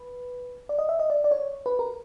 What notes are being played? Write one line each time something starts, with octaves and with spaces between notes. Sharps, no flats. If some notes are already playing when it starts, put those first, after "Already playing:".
Already playing: B4
D5
D#5
E5
D#5
D5
D5
C#5
B4
A#4